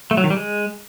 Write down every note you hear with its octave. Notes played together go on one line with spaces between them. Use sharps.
A3
F#3
D#3
G3
G#3